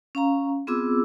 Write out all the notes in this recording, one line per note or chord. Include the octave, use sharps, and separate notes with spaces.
C#4 F5 A#5
B3 C4 F4 G#4 D6 E6